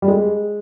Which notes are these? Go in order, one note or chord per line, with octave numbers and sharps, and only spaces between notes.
G3
G#3